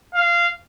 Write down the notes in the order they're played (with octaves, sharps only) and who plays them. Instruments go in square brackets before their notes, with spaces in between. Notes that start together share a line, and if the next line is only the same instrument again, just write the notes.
[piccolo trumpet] F5